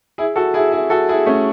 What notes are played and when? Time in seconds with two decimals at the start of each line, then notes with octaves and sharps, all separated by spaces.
0.18 E4 G#4
0.36 F#4 A4
0.54 E4 G#4
0.72 E4 G#4
0.90 F#4 A4
1.09 E4 G#4
1.26 A3 C#4